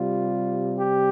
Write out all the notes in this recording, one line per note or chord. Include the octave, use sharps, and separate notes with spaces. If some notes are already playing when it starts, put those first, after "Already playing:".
Already playing: C3 G3 F4
G4